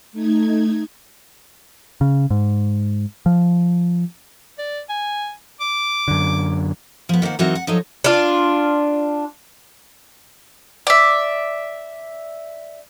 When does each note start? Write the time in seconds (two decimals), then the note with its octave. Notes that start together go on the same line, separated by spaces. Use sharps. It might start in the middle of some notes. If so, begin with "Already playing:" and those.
0.13 A3 D#4 G#6
2.01 C#3
2.30 G#2
3.26 F3
4.58 D5
4.89 G#5
5.61 D6
6.08 F#2 D3
7.09 F3 B3
7.22 D#3 A#3 C5 F#5
7.39 E3 F#3 C4 D#4 F#4 A#4
7.55 F#5
7.67 F3 F#3 D#4 A4 C#5 D#5
8.04 D4 F4
10.87 D5 E5